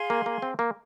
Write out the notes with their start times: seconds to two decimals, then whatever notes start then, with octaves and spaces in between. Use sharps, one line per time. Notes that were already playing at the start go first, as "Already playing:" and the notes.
Already playing: G#4 F5 C6
0.10 A#3
0.26 A#3
0.42 C4
0.59 A#3